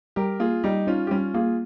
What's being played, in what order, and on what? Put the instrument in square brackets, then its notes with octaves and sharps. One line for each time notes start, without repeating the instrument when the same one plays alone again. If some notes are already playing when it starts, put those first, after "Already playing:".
[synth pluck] G3 [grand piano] G4 A#4
[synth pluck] A#3 [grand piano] F4 G#4
[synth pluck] G3 [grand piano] D#4 G4
[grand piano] C#4 F4 [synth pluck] D#4
[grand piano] G4
[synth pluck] G3 [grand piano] C#4 F4
[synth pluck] A#3 [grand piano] F4 G#4